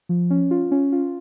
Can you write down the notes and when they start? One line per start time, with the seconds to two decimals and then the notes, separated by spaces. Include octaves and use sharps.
0.09 F3
0.30 C#4
0.51 F4
0.71 C#4
0.92 F4